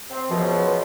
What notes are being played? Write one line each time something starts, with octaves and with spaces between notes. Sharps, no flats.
C4
C#2 F#2 B2 F3